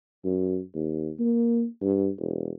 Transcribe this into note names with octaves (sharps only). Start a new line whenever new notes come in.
F#2
D#2
A#3
G2
E1